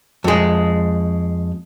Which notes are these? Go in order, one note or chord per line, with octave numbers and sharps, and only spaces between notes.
F2 G#3